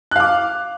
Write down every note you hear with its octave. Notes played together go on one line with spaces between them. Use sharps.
F5 D6 F#6